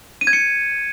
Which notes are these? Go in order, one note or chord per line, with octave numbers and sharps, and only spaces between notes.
D#7
G#6
C#7